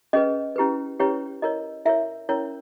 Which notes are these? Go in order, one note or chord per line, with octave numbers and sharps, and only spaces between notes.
C#4 G#4 B4 D#5
C#4 E4 G4 B4
C#4 E4 G4 B4 C#5
E4 A#4 C#5 D#5
E4 A#4 C#5 E5
C#4 E4 A#4 C#5